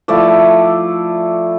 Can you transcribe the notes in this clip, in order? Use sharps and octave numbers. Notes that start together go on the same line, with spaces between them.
F3 A3 E4 D5